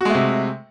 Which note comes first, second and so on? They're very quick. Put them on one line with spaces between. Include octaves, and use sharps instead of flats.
F#4 G#3 A3 C3